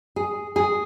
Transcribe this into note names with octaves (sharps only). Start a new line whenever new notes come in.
G#4
G#4